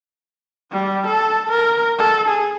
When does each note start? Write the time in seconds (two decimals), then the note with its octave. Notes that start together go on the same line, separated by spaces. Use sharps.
0.72 G3
1.07 A4
1.49 A#4
1.99 A4
2.28 G#4